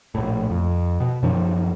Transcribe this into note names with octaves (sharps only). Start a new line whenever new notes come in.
A#1 A2
F2
B2
F#2 D#3 F3